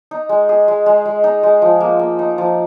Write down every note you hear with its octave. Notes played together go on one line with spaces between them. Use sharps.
D#4
G#3
G#4
G#3
G#3
G#3
D#4
G#3
F3
A#3
A#3
D#4
F3